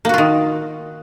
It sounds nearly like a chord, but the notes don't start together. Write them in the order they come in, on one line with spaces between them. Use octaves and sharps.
A#3 F#4 F4 D#3